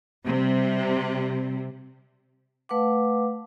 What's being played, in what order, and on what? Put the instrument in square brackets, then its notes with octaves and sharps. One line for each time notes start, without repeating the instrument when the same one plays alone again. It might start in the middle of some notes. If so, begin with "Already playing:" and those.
[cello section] C3 G3
[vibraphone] A3 B4 F5 F#5 D6